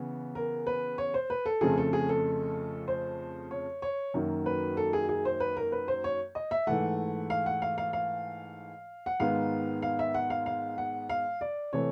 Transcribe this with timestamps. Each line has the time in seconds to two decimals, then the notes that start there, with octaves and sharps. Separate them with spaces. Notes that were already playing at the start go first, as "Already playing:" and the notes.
Already playing: C#3 E3 B3
0.35 A#4
0.67 B4
0.98 C#5
1.14 C5
1.30 B4
1.46 A4
1.61 F2 C#3 F3 A3 G#4
1.77 A4
1.93 G#4
2.09 A4
2.88 C5
3.51 C#5
3.82 C#5
4.14 F#2 D#3 F#3 A#3
4.46 B4
4.77 A4
4.93 G#4
5.09 G#4
5.25 C5
5.40 B4
5.57 A#4
5.72 B4
5.88 C5
6.04 C#5
6.35 D#5
6.51 E5
6.67 G#2 E3 A3 F#5
7.30 F5
7.46 F#5
7.62 F5
7.78 F5
7.93 F5
9.06 F#5
9.20 G#2 D#3 G#3 B3 F5
9.82 F5
9.99 E5
10.14 F#5
10.30 F5
10.46 F5
10.78 F#5
11.09 F5
11.41 D5
11.73 C3 E3 A3 C#5